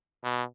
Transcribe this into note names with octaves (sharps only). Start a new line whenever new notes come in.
B2